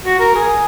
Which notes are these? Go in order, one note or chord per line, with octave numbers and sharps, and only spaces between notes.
F#4
A#4
G#4